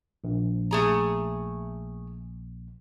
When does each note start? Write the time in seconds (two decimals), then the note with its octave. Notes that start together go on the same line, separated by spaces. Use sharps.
0.24 A#1
0.71 A3 G#4 A#5